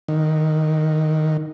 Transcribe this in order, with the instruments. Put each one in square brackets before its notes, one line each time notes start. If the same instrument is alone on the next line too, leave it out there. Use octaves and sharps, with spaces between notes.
[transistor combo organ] D#3